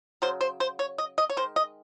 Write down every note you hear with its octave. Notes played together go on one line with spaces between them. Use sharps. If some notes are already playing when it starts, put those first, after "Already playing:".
C#3 F#3 C5
C5
C5
C#5
D#5
D#5
C#5
D#3 G#3 C5
D#5